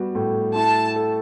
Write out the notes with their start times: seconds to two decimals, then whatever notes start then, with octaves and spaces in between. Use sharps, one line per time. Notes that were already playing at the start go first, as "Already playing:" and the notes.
Already playing: G3 B3 F#4
0.15 A2
0.55 E4 A5
0.96 A4